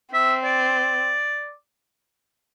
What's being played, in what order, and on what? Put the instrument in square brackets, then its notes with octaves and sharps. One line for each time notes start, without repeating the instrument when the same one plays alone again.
[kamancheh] C4 [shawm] E5
[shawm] D5